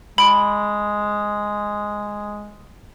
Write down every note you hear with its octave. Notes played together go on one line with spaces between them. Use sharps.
G#3 B5 D7